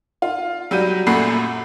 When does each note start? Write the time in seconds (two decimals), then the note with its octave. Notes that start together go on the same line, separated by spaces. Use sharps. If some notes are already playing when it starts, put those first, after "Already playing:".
0.22 F4
0.71 F#3 G3 G6 D#7
1.07 F#2 A#2 A3 F#5 B5 C7